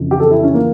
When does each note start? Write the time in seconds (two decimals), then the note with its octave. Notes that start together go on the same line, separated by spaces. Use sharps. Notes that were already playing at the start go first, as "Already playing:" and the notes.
Already playing: F2 C#3 E3
0.11 G4
0.20 A4
0.31 E4
0.43 C#4
0.54 E3 A#3